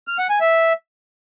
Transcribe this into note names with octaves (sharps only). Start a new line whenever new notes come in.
F6
F#5
G#5
E5